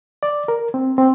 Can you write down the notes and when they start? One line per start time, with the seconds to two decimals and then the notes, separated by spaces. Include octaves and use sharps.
0.23 D5
0.48 A#4
0.74 C4
0.98 C4